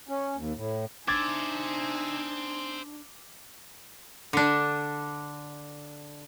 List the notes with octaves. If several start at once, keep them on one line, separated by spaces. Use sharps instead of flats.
C#4
D#2
A2
D4 D#4 C5 E5 G#5 D6 G#6 A6
D3 D4